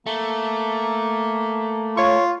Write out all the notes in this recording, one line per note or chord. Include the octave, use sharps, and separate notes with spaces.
A3 A#3
F4 C#5 C#6